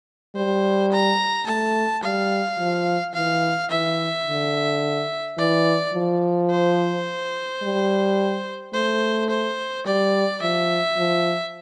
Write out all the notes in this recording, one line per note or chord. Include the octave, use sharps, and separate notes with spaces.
G3 C5
A#5
A3 A5
G3 F5
F3
E3 F5
E3 E5
D3
E3 D5
F3
C5
G3
A3 C5
C5
G3 D5
F3 E5
F3